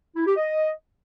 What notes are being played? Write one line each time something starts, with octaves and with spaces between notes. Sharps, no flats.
E4
G4
D#5